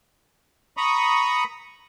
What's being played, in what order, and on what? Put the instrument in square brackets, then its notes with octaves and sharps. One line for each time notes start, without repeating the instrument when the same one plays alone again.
[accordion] A#5 B5 C#6 D#6